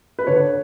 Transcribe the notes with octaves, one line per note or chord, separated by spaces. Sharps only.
B4
D3 C#5